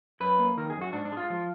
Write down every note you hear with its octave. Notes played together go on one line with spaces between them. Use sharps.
F#2 B4
A#3
D#3 A#4
G#4
F#2
F#4
G#2 D4
D4
G#3 F4
F3